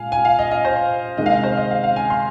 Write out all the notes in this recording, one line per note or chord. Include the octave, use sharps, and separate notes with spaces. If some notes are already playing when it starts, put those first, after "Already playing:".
Already playing: A#2 G#3 F5 G#5
G#5
F5
D#5
D#5
C5
C3 D#3 G#3 D#5
F5
D#5
C5
D#5
F5
F5
G#5
C6